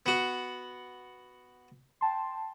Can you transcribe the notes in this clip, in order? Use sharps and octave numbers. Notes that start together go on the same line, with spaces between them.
B3 F#4
G5 A5 C6